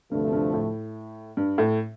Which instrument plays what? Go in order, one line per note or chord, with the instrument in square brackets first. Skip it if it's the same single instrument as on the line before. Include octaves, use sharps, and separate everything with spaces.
[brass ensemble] D2 C3 F3 A3 [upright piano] G2
[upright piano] G2
A2
G2
A2